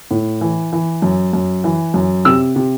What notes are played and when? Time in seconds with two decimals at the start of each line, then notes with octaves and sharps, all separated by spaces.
0.11 A2
0.41 E3
0.73 E3
1.02 F#2
1.33 F#2
1.64 E3
1.94 F#2
2.25 C3 E6
2.56 C3